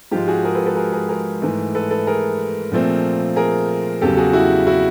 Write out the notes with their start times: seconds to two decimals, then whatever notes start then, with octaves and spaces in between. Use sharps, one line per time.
0.12 G#2 F3 G#3 F4 G4
0.28 F#4 G#4
0.45 G#4 A#4
0.55 A4 B4
0.66 A4 B4
0.76 G#4 A#4
0.93 G#4 A#4
1.09 G#4 A#4
1.42 G#2 E3 A3
1.75 A4 B4
1.90 A4 B4
2.07 G#4 A#4
2.72 A#2 F3 A3 C4
3.36 G#4 A#4
4.01 E2 C#3 F#3 G4 A4
4.17 F#4 G#4
4.33 E4 F#4
4.67 E4 F#4